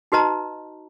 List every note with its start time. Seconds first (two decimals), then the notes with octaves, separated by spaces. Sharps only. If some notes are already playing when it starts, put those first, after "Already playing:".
0.12 D#4 F#4 B4 D#5 A5 A#5